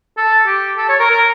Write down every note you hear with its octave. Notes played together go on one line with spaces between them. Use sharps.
A4
G4
A4
C#5
A#4
A#4